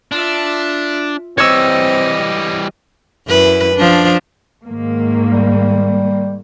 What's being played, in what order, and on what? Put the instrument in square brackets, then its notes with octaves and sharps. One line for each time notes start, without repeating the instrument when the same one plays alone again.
[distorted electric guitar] D4 [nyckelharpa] F4 E5
[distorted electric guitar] E3 G3 [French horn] C4 [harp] C#5 E6 [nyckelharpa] D#5
[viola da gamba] F#2 E4 B4
F3 D4
[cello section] G#2 D#3 A#3
[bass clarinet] G3